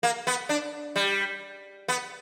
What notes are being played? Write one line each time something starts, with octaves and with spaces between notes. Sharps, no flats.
A#3
B3
D4
G3
B3